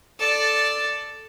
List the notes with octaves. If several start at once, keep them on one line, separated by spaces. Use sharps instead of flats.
A4 D5